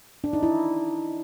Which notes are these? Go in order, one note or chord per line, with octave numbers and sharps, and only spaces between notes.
D4
D#4
E4